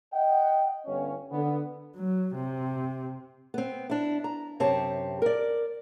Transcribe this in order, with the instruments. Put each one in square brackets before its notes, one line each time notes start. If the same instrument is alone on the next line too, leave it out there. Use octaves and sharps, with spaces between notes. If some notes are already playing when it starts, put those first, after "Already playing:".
[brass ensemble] D#5 F#5 G5
G1 C#4
D3 B3
[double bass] F#3
C3
[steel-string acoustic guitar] B3 C4
D4 E4
A#5
F#2 C3 C4 G4 C#5 A5
A#4 D5